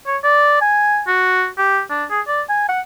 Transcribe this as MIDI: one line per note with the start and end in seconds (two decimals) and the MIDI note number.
0.07 0.17 73
0.24 0.60 74
0.61 1.02 80
1.07 1.47 66
1.58 1.81 67
1.90 2.05 62
2.10 2.21 68
2.27 2.42 74
2.49 2.68 80
2.69 2.81 78